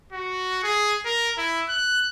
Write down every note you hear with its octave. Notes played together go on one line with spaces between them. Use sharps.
F#4
G#4
A#4
E4
F#6